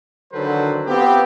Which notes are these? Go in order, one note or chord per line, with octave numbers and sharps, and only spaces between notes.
D3 D#3 F#3 A4 B4 C5
B3 C4 F4 G4